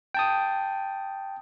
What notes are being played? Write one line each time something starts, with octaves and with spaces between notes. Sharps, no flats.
G5 A5 D#6